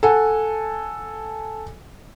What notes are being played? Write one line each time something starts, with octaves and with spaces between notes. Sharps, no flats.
A4 F#5 G#5